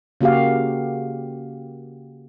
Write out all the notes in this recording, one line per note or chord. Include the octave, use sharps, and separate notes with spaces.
C#3 A#3 F#4 G4 F5